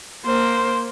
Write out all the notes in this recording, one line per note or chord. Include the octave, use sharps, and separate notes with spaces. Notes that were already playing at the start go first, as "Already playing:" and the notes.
A#3 C5